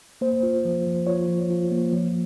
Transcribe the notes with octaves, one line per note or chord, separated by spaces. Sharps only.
A#3 C5
F4
F3
F3
F4 C#5
F3
F4
A#3
F3